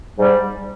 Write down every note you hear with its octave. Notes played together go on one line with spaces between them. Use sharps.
G#2 G3